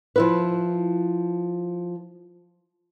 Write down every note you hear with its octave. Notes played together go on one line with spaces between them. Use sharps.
F3 E4 B4